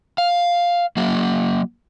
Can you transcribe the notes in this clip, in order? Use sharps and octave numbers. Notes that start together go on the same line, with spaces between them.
F5
F#3 A#3